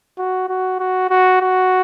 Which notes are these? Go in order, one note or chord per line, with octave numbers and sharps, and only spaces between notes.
F#4
F#4
F#4
F#4
F#4